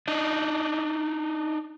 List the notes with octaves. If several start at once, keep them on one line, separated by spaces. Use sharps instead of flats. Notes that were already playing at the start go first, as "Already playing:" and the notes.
D4 D#4